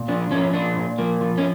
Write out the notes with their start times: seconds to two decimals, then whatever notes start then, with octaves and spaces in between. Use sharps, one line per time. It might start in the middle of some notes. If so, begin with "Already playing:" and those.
Already playing: A#2
0.08 F3 D4
0.31 F3 C#4
0.53 A#2 D4
0.77 A#2
0.98 F3 A#3
1.21 F3
1.38 C#4